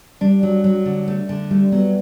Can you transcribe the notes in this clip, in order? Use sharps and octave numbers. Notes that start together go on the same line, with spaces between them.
G3 D4
F#3
F#3
D3
A3
D3
G3 A3
F#3 B3